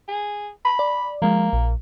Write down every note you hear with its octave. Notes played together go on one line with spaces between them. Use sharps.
G#4
B5
D5
F3 G#3 A#3
A#1